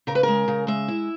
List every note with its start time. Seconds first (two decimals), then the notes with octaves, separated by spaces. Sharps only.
0.07 C#3 A#4
0.15 B4
0.23 G#3 A#4
0.48 C#3
0.67 G#3 E5
0.88 E4